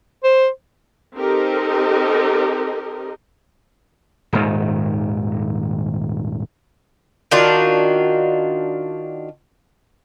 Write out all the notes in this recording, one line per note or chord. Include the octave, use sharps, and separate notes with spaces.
C5
C4 D#4 G4 A4 A#4 D#5
D#1 G#2 D#3
D#3 D4 F4 F#4